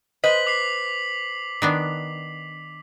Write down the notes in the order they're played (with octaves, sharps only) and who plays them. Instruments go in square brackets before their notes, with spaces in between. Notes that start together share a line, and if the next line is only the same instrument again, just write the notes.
[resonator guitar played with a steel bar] B4 C5 D#5 [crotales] B6 F#7
[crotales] D6 B6 C7
[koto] D#3 B3 D4